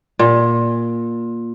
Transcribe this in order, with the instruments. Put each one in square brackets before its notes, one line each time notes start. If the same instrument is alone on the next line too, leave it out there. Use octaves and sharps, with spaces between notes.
[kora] A#2